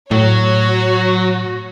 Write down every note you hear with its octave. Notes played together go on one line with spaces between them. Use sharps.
A2 F#3 F#4 C#5